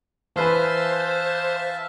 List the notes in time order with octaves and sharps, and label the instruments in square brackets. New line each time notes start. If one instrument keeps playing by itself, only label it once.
[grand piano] E3 B4 G#5 [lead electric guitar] C5 [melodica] E5 F5 A5